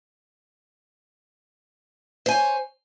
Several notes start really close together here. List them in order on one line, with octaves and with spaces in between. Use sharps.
C5 G#5 C#5